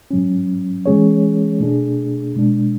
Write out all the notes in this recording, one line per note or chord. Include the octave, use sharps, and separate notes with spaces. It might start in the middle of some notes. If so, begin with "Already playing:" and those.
G#2 F#3 C#4
E3 G#3 C#4 G#4 C#5
B2 A3 D4 G#4
B2 G#3 D4